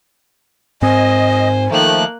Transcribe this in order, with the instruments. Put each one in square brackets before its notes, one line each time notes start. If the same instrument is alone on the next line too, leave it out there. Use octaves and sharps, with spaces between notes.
[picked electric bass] G#2 C4 [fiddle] C5 [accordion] D#5 [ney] G#5
[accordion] D#3 F3 A3 [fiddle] A#3 F#6